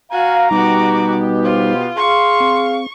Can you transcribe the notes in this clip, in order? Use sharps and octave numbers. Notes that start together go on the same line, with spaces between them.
F#4 F5 G#5 A#5
B2 G3 B3 D#4 F#4 G4 D6
F4 C5
G#4 F5 C6 C#6
C4